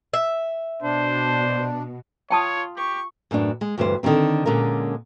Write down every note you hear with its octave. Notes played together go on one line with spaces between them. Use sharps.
E5
B2 D4 C5
F4 C#5 G5 A5 D#6
G4 C#6
F#2 A2 E3 D4
G#3
D2 G2 E3 C5
D3 D#3 F3 F#3 C4
A#2 D3 G#3 C#4 A#4